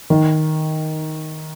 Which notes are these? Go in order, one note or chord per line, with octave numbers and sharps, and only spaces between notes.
D#3